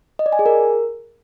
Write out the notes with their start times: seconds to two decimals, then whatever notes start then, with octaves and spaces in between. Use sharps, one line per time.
0.19 D#5
0.26 D5
0.32 G#5
0.39 G#4
0.46 A#4